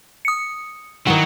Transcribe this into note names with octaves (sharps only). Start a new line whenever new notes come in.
D#6 C#7
D#3 F#3 E4 F#5